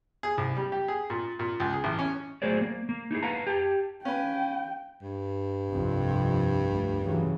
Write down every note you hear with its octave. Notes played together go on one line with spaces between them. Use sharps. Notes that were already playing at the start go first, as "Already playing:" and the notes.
G#4
C2
G3
G4
G#4
A#2
A#2
C#2
G#4
A1
C#4
F#3 A3 G#4 C5 D5
A#3
A#3
D#4 E4 G4 G#4
B4 F5 F#5 A5 A#5
G4 A5
C#4 B4 F5 G5
G2
C2 F2
D2
C#3 E3 F#3